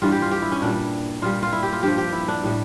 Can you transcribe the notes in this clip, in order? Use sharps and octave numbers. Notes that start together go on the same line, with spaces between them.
G2 E3 G3 F4
G4
F4
G4
E4
C#4
A#2 G3 D4
A#2 G3 F4
F4
E4
G4
F4
G2 F3 G4
G4
E4
D4
A2 G3